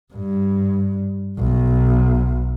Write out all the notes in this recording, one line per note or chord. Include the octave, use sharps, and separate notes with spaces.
G2
B1